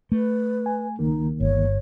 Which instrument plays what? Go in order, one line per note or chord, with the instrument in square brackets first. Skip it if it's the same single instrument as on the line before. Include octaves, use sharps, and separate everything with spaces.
[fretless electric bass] A3 [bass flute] B4
[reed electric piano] G#5
[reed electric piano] C#2 D#3 A#3 [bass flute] D#4
[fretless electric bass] G1 [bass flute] C#5